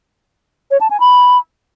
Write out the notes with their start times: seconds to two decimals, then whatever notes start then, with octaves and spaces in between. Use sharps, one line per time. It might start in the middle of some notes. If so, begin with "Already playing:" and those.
0.71 C#5
0.81 A5
0.90 G#5
1.00 B5